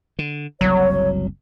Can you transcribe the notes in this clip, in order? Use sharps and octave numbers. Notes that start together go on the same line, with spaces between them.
D3
F#1 C2 F#3 C#5